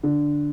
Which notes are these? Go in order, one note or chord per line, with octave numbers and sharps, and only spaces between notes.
D3